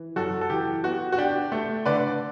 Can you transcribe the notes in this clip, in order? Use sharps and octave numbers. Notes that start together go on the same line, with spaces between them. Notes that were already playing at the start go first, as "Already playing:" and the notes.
Already playing: E3
F#2 F#4 A4
A4
E3 G4
B3 F#4
F#4
D4 G4
A3
D3 B4 D5